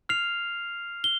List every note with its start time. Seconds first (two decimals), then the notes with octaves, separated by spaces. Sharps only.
0.09 F6 C7 F7
1.04 G7